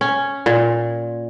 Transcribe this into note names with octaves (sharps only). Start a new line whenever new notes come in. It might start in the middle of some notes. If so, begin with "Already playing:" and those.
C#4
A#2